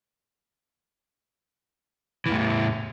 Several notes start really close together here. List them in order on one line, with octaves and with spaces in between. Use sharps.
E3 E2 A2